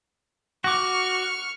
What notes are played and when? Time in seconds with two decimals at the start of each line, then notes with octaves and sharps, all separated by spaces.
0.64 F#4 C#6 D6 F6